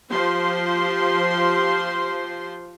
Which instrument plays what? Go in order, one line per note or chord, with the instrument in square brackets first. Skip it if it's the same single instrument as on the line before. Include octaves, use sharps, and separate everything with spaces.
[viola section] F3 G4 C5 C6